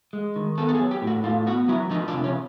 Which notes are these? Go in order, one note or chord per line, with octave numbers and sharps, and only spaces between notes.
G#3
D#3
B3 A4
A4
G#4
F#3
G4
A2
F#4
A2 F4
B3 F#4
F#3 E4
F3 D#4
D4
C3
C#4